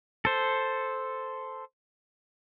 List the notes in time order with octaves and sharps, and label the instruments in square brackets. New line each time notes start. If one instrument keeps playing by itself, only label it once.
[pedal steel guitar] A4 C5